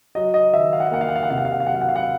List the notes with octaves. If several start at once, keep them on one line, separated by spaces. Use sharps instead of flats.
F#3 D#5
D#5
D#3 E5
F5
F#5
F5
A#3 F#5
F5
F#5
F5
F#5
C3 F5
F#5
F5
F#5
F5
F#3 F#5
F5
F#5
F5
F#5
F5